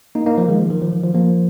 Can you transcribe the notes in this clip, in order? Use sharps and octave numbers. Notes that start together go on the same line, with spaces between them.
A#3 D#4
A#3 D#4
F3 A#3
D#3 G#3
F3
D#3
F3
D#3
F3
F3 A#3